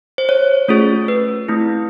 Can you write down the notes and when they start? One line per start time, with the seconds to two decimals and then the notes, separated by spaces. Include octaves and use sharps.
0.18 C5
0.29 C#5
0.68 A3 C#4 F4 G#4
1.08 B4
1.48 A3 C4 E4